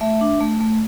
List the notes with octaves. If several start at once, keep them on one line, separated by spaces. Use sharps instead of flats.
A3 E5
D4
A3
A3